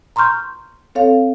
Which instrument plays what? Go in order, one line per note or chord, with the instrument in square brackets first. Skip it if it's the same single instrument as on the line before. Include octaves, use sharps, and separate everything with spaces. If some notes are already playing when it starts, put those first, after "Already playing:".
[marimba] A#5 C6 C#6 F6 G6
C4 A4 C#5 F5